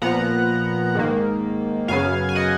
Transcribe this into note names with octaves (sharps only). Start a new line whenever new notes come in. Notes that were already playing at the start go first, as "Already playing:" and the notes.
A#2 F3 B3 F#5 A#5
G#2 D#3 A#3
F#2 C#3 F#3 B3 F5 G#5
G#5
D#5 F#5